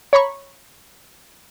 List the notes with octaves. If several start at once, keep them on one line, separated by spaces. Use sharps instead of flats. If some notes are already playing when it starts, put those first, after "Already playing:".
C#5 A#5 B5 C#6